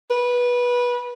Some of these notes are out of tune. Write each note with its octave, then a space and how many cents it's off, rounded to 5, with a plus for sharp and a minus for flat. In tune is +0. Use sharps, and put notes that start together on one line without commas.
B4 -20